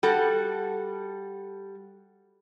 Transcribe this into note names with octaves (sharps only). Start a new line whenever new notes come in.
G3 F#4 A4